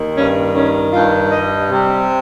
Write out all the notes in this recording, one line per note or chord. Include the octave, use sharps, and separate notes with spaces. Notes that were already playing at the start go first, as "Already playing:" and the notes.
Already playing: D#2 D#3
G2 C#4
D#3 C#4
G2 F4
G3 D#5
C3